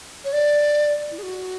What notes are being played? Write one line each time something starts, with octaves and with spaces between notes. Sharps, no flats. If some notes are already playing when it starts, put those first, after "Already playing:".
C#5
D5
E4
G#4
F#4